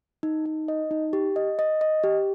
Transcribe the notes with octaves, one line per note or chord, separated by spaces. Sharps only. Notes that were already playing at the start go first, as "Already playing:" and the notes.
D#4
D#4
D#5
D#4
G4
D#5
D#5
D#5
G4